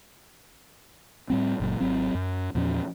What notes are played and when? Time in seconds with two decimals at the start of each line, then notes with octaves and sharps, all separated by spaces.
1.30 A2 G3 C4
1.60 F#1 A#2 F#3
1.80 G#1 F#3 C4
2.15 F#2
2.55 E2 A#2 F3 C#4